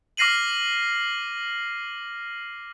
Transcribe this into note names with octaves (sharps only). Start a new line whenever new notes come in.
D6 F6 A#6 C7 D#7 F#7